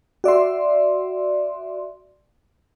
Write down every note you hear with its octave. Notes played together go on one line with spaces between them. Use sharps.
F#4 D5 E5 C6